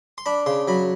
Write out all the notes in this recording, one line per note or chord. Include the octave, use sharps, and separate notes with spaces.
C6
D4 B5
C#3 C6
F#3 B5